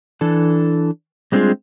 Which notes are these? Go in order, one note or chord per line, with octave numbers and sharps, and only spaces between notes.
E3 D4 A4
G3 G#3 C4 D4 F4 G#4